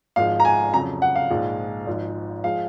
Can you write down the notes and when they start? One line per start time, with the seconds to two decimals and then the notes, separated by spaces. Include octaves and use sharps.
0.16 G#1 G#2 F3 G#3 F5
0.40 A#5
0.45 G#5
0.74 F2 C#3 F#3 A#5
1.02 F#5
1.16 F5
1.30 A#1 G#2 F3 G#3
1.86 G#1 G#2 F3
2.44 F3 G#3 F5